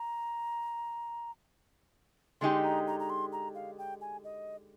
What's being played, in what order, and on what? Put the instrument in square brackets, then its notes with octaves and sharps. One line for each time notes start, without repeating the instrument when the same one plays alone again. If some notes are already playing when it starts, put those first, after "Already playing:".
Already playing: [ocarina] A#5
[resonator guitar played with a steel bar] D3 G#3 D#4 G4 [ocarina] C6
[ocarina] A#5
A#5
A#5
C6
A#5
F5
G5
G#5
D#5